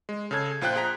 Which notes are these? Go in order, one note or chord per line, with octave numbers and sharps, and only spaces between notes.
G#3
C#3 A4 G#6
A#1 F4 C5 G5 F#6
G#4 G5 A#5 B6